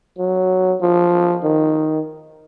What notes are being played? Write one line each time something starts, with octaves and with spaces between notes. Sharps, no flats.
F#3
F3
D#3